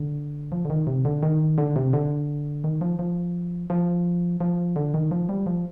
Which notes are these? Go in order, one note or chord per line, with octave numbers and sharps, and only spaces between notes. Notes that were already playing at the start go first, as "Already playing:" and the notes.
Already playing: D3
F3
D3
D#3
C3
D3
D#3
D3
C3
D3
D#3
F3
F3
F3
F3
D3
D#3
F3
G3
F3